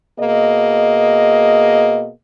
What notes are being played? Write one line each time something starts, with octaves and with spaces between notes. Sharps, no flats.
B2 A#3 G#4 D#5